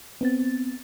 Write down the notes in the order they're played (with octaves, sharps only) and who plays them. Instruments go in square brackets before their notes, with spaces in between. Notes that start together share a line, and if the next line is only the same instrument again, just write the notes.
[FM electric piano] B3 C4 A6